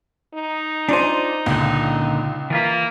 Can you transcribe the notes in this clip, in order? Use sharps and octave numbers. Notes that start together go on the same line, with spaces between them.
D#4
D4 F4 C5 D5 G#5
C#2 A#2 D3
E3 A#3 F4 B4